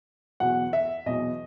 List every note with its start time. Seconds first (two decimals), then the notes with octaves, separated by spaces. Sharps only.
0.40 E2 B2 F#3 F#5
0.73 E5
1.06 E2 B2 F#3 D#5